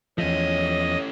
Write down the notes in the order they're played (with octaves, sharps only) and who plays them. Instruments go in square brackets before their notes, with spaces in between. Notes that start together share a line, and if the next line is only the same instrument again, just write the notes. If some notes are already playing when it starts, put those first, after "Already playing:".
[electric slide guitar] E2 F3 [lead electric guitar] A3 C#4 [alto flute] C#5 [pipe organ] D#5